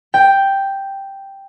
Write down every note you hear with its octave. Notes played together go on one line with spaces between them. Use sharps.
G5